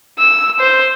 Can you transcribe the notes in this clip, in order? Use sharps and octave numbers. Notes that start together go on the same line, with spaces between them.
E6
C5